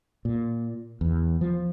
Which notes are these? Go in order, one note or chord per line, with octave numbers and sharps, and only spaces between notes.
A#2
E2
F3